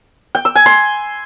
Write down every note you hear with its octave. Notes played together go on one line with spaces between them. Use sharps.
G5
E6
G#5
C6